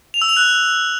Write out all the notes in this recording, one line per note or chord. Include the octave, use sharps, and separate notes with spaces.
F7
E6
F7
F#6